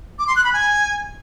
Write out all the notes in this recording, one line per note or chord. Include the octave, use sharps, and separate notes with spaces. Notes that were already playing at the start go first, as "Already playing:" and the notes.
D6
C6
F#6
B5
G#5